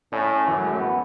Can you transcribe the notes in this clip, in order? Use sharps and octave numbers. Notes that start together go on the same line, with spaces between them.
A2 C#4
F#2 E3
F#3
G#3
A3
B3